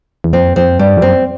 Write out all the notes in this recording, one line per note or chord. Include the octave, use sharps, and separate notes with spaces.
E2
F2 C4
F2 C4
G2 G3
F2
F#2 C4